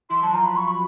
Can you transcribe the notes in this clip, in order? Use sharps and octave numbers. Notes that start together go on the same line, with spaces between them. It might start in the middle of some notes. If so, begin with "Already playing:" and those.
E3 E4 C6
F#3 F#4 A5
F3 F4 A#5
B5
C#6
B5